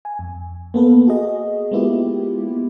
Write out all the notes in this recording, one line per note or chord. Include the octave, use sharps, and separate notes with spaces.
G#5
F2
A#3 B3 A4 B4
F#4 G#4 D#5
G#3 A#3 B3 E4 F4 G4